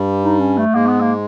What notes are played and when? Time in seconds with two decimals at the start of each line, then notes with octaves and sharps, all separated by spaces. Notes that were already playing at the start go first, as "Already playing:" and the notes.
Already playing: G2 G3
0.23 D#4
0.40 C#4
0.58 A3
0.74 G#2 G#3 A#3
0.87 B3
1.01 A#3